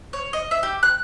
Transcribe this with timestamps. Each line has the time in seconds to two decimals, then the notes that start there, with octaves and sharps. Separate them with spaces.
0.13 C#5
0.33 D#5
0.51 E5
0.63 G4
0.83 F#6